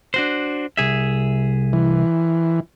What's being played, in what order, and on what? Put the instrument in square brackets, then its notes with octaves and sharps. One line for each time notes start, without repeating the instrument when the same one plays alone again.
[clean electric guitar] D4 F#4 C5
C2 G#4 E5
[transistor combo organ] E3